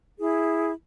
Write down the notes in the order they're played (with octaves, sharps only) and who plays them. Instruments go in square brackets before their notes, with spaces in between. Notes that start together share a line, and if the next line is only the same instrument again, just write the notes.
[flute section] E4 G#4